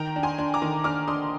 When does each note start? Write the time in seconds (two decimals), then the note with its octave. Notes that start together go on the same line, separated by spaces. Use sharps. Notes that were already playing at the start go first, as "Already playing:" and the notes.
Already playing: D#3 G5 A#5
0.16 D4
0.23 G#5 C6
0.38 D4
0.54 A#5 D6
0.62 D#3
0.84 D4 D6 F6
1.08 D4 C6 D#6